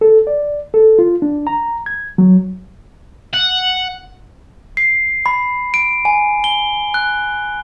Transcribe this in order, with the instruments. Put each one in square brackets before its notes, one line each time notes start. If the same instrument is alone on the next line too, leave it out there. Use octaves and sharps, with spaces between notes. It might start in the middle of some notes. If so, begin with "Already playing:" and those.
[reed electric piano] A4
D5
A4
F4
D4
A#5
G#6
F#3
[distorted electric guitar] F#5
[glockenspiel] C7
B5
D7
G#5
G7
F#6